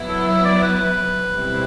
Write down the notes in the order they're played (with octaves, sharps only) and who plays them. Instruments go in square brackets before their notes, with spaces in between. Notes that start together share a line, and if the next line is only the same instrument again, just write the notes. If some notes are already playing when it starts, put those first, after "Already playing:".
Already playing: [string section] F#3 B3 E4
[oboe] A4
E5
D5
B4
[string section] B2 G3 C4 E4